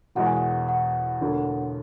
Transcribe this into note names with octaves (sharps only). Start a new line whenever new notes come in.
E1 E2 B2 G#3 F#5
G#5
F#5
F#5
E1 D2 D3